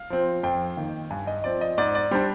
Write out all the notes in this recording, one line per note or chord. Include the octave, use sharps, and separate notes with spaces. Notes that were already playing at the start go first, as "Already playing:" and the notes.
Already playing: F5
F3 C4
F2 G5
D#3 A#3
G2 G#5
D#5
F3 C4 D5
D#5
G#2 D5
D5
G3 D4 C5